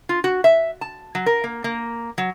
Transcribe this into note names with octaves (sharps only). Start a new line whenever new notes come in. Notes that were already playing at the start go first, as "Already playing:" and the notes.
F4
F#4
E5
A5
F#3
A#4
A#3
A#3
F#3